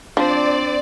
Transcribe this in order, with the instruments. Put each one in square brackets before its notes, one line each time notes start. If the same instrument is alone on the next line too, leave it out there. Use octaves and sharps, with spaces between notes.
[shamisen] F3 [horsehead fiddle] C4 C5 [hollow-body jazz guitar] D4 [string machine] D5